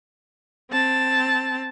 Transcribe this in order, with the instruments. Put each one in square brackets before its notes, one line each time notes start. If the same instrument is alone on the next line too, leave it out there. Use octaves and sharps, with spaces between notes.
[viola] C4 A5